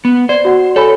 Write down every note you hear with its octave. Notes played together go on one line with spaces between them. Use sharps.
B3
C5 D5
F#4 F#5
A4 C#5 G#5 B5